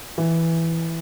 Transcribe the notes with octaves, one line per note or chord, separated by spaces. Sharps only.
E3